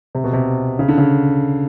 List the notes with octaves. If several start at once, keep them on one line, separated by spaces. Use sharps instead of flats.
C3
B2
C3
C#3
D3
C#3